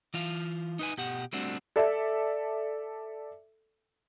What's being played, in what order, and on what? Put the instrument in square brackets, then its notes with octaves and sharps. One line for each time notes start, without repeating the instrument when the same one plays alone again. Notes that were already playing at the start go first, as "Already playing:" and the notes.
[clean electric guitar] E3 F4 F5
D#4 B4 G#5
B2 G4 F#5
G3 A3 C4 D4 F#4
[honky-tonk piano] A4 D5 E5